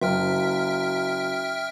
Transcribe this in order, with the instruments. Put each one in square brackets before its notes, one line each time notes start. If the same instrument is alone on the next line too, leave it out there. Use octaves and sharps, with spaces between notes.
[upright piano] F#1 [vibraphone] F#4 F5 A#5 [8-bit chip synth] E5 G5 F6